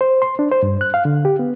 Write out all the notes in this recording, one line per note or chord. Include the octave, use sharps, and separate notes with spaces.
C5
C6
D4
C5
G2
F#6
F5
D3
G4
B3